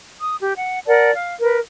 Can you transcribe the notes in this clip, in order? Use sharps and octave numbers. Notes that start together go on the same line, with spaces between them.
D#6
G4
F#5
A#4 D5 F#5 A5
F5
A#4 B4